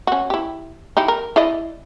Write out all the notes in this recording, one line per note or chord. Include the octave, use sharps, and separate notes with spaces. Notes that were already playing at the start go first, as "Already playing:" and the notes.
C#4 F#4
E4 G4
D#4 E4 G4
A#4
E4 D5 D#5